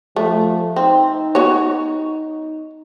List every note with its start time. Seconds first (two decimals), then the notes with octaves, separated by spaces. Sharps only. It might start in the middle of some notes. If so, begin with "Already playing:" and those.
0.16 F3 A3
0.76 C4 D#4
1.35 B3 F#4 C#5